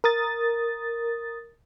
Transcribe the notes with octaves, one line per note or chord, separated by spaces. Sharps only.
A#4 D#6 A6